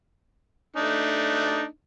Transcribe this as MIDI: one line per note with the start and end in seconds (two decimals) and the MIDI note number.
0.76 1.65 57
0.76 1.65 62
0.76 1.65 63